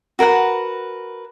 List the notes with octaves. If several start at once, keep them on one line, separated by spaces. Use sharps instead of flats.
F#4 A#4 B4 F#5